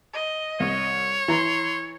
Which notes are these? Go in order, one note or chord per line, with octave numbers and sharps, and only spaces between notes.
D#5
C2 C#5
E3 A#5 C6